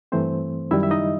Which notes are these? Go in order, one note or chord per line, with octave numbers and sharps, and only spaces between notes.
G2 E3 A3 C4 C5
F#2 D#3 G3 E4 E5
E5
D#4 D#5